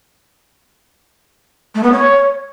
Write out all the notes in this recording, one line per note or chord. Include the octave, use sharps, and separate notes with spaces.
A3
B3
C#5